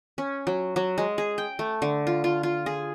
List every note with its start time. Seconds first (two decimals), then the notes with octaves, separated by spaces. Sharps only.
0.18 C#4
0.47 F#3
0.76 F#3
0.98 G#3
1.18 G#4
1.38 G5
1.59 A3
1.82 D3
2.07 F4
2.24 F4
2.43 F4
2.66 G#4